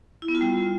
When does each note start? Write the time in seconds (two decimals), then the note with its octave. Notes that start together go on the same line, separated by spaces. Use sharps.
0.22 E4
0.28 B3
0.35 F4
0.41 G3